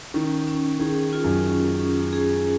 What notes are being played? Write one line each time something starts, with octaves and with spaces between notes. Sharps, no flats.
D#3 C#4
C#4
D#3 G#4
F4
F#2
C#4
C#4
G#4